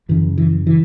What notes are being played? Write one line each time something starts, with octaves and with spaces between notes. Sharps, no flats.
F#2 C#3 E3
E3
E3